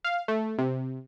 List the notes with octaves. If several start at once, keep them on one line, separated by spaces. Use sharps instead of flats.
F5
A3
C3